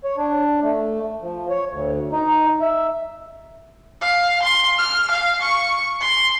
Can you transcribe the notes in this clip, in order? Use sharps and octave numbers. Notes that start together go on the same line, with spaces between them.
C#5
D4
A3
F3
C#5
D2
D#4
E5
F5
C6
F6
F5
C#6
C6